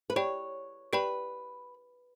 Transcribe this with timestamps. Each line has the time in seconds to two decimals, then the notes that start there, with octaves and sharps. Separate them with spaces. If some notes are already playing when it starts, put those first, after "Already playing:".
0.10 B4
0.16 G4 C#5 D5 G5 B5
0.93 G4 B4 D5 G5 B5